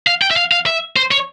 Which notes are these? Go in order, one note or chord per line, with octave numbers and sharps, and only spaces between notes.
F5
G5
E5
F5
F5
E5
C5
C#5